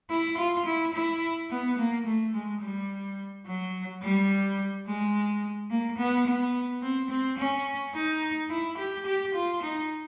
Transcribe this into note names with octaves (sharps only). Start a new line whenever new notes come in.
E4
F4
E4
E4
B3
A#3
A3
G#3
G3
F#3
G3
G#3
A#3
B3
B3
C4
C4
C#4
D#4
E4
G4
G4
F4
D#4